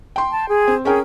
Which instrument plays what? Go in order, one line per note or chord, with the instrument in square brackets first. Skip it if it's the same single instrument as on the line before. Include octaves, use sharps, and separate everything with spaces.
[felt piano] G5 C6
[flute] A5
G#4
[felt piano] C4
[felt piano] C#4 A#4 G5 [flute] G#4